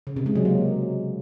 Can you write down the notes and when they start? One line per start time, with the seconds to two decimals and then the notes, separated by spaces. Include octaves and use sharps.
0.07 C#3
0.16 C3
0.26 G#3
0.36 F#3
0.45 A#3